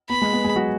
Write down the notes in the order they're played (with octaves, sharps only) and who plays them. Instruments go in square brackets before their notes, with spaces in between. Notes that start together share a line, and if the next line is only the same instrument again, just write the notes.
[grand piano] B3 [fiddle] B5
[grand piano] G#3
B3
G#3 G#4
F#3 F#4